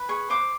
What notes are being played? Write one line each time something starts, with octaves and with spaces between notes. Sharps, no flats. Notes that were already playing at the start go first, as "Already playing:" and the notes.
Already playing: B4
G#4 C#6
C5 D6